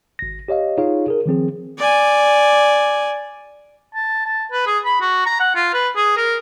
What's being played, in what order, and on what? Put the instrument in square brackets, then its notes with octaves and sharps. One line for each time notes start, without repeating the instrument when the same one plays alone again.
[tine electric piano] G#1 A#6
G4 C#5 D#5 F5
D#4 F4 G#4 C#5 F5
G#4 A#4
D#3 F3 C4 G#4
[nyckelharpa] D5 G#5
[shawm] A5
A5
B4
G#4
B5
F#4
A#5
F#5
F4
B4
G#4
A#4